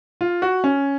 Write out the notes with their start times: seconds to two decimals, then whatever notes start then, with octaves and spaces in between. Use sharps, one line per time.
0.21 F4
0.42 F#4
0.64 C#4